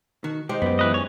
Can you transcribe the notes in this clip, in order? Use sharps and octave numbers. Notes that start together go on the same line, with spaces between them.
D#3 F#4
G#3 D#4 G4 C5
F#2 F#3 B3 G4
E3 B4 D#5
C#4 C#5